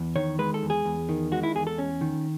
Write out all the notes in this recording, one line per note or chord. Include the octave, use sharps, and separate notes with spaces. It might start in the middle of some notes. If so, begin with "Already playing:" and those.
Already playing: E2
D#3 C#5
G#3 B4
A4
E2
G#4
E2
D#3
G#3 F#4
E4
E2 G#4
A4
C#4
D#3